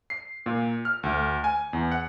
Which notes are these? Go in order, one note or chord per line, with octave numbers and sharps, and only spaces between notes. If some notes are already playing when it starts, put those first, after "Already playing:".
C7
A#2
F6
D2
G#5
E2
F#5